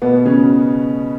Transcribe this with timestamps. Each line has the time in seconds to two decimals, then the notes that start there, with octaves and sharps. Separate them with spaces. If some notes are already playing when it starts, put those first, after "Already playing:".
0.02 B2 B3
0.26 C#3 C#4